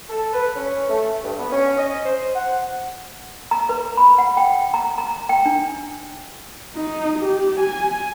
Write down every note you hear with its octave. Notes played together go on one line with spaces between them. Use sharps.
A4
B4
C#4
A3
G2
B3
C#4
D#5
C5
F#5
A#5
B4
B5
F#5
G5
A#5
A#5
G5
D4
D#4
G4
G#5